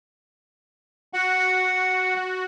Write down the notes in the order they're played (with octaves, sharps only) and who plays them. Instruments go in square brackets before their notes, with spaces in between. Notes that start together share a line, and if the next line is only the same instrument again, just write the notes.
[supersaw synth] F#4 [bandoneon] F#5